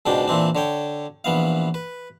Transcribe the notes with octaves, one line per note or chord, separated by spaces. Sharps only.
C#2 G#2 B2 D4 G5
A#2 E3 C4 D4
D3 C#5 G5
A#1 E3 B3 F5
B4